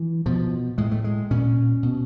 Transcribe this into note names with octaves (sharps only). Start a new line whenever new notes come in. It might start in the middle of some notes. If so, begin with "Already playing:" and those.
Already playing: E3
B2 F3
A2 G#3
A3
G#3
A#2 C#4
B2